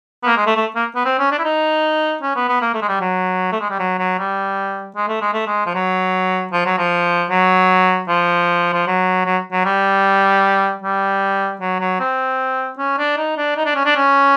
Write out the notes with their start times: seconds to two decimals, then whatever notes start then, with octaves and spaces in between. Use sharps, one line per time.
0.23 B3
0.26 A#3
0.37 G#3
0.47 A3
0.57 A3
0.76 A#3
0.95 B3
1.05 C4
1.19 C#4
1.31 D4
1.39 E4
1.44 D#4
2.22 C#4
2.36 B3
2.49 B3
2.61 A#3
2.74 A3
2.82 G#3
2.88 G3
3.00 F#3
3.52 A3
3.61 G#3
3.70 G3
3.79 F#3
3.99 F#3
4.18 G3
4.96 G#3
5.08 A3
5.21 G#3
5.33 A3
5.47 G#3
5.66 F3
5.75 F#3
6.52 F3
6.66 F#3
6.78 F3
7.30 F#3
8.08 F3
8.73 F3
8.88 F#3
9.26 F#3
9.52 F#3
9.65 G3
10.82 G3
11.61 F#3
11.80 F#3
12.00 C4
12.79 C#4
12.98 D4
13.17 D#4
13.37 D4
13.57 D#4
13.65 D4
13.76 C#4
13.85 D4
13.96 C#4